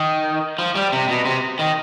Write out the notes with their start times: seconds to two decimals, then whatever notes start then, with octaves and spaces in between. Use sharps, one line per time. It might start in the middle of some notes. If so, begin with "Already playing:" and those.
Already playing: D#3
0.59 F3
0.75 G3
0.93 C3
1.09 B2
1.25 C3
1.59 D#3